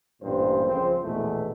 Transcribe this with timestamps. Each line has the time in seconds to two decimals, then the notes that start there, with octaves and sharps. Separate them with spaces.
0.22 A1 G2 A#2 C5
0.68 C#2 F3 C4 C5
1.04 A#1 E2 G#2 B2 A3